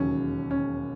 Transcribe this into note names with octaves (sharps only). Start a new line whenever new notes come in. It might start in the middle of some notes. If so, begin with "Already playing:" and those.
Already playing: E1 D#2 C#3 F#3 C#4
C#4